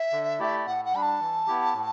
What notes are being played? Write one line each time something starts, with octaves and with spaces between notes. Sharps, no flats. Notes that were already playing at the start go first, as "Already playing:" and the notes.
Already playing: E5
D3
A3 E4 G4 D5
A2 F#5
F#5
G3 D4 B5
A5
E3
B3 E4 G4
A2